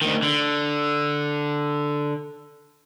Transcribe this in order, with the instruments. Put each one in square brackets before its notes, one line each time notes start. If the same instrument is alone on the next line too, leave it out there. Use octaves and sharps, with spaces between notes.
[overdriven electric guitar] D2 D#3
D3